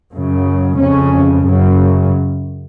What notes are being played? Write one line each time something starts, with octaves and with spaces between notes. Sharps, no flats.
F#2 C#3
F2 C#3 C#4
F#2 C#3